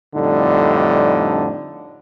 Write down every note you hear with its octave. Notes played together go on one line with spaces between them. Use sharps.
F2 A2 D3 G3 D4 D#4